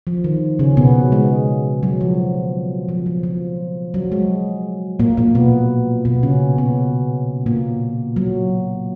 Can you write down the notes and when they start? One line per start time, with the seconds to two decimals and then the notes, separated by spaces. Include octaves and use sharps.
0.07 F3
0.24 D#3
0.59 C#3 C#4
0.77 B2 B3
1.12 G#3
1.83 F#3
2.01 F3
2.89 F3
3.06 F3
3.23 F3
3.94 F#3
4.12 G#3
5.00 A#2 A#3
5.17 A#2 A#3
5.35 B2 B3
6.05 B2 B3
6.23 C#3 C#4
6.58 B2 B3
7.46 A#2 A#3
8.16 F#3